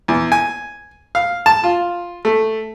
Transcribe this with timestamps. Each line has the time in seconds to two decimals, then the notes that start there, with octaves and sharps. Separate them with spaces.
0.08 E2
0.32 G#5
1.15 F5
1.46 A5
1.64 F4
2.25 A3